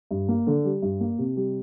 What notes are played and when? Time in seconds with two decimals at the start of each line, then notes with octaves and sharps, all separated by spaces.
0.11 G2
0.29 A#3
0.47 D3
0.65 G3
0.82 G2
1.01 A#3
1.18 C3
1.37 G3